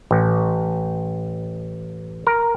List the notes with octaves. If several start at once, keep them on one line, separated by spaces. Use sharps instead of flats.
A1
A#4